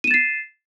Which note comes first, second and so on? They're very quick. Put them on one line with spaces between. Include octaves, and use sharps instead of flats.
D#7 E7 A6 C7